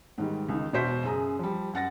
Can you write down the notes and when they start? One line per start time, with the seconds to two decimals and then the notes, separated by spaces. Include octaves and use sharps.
0.18 G#2 D#3 G3
0.49 C#2 D#3
0.73 E1 B2 F#4 C5 B6
1.03 F#2 C#3 G#4 A#5
1.39 F3 G3
1.73 F#2 F#5 A6 A#6